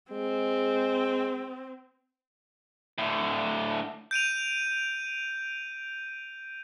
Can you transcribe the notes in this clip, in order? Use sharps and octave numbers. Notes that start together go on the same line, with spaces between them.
G#3 C4
A2 D3
G6 D7 D#7 F7